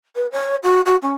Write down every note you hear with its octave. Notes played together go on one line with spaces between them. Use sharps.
B4
C#5
F#4
F#4
C#4